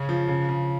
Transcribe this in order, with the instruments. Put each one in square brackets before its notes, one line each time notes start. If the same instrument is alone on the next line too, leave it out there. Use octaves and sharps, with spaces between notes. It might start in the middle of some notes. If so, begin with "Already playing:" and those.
Already playing: [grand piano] C#3 C#4
F3
C#3
C#3